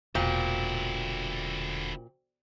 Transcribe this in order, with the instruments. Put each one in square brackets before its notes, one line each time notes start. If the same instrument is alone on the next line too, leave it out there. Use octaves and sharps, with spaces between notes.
[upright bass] E1 [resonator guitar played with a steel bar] A#2 [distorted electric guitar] D3 E4 [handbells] F#4 C5 G5